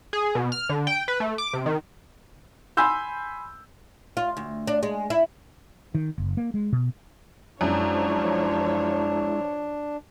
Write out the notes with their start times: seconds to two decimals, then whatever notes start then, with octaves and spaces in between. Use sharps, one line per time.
0.13 G#4
0.35 B2
0.52 F6
0.69 D3
0.87 G5
1.08 B4
1.20 A3
1.38 D6
1.53 C3
1.66 D#3
2.77 G#5 B5 C6 E6 G6
4.17 F4
4.37 D2
4.67 D4
4.83 G#3
5.10 E4
5.95 D#3
6.18 F#1
6.37 A#3
6.54 G#3
6.72 B2
7.61 F#2 F3 G#3 D4 E4 C#5